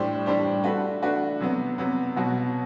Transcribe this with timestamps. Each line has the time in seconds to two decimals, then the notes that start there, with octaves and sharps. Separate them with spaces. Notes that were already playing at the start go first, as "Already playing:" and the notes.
Already playing: A2 G3 D4 G4 C5
0.26 A2 G3 D4 G4 C5
0.64 A3 D4 F#4 B4
1.02 A3 D4 F#4 B4
1.40 C3 F#3 B3
1.78 C3 F#3 B3
2.16 B2 F#3 B3 F#4